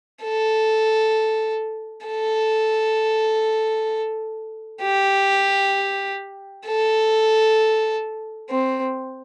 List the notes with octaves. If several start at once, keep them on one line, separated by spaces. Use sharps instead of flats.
A4
A4
G4
A4
C4